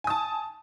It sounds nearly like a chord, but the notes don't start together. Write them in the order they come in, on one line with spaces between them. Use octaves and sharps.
G#5 D#6 A5